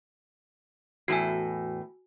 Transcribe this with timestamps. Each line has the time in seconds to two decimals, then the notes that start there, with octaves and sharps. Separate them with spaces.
1.08 E2 A2 F#4 G#5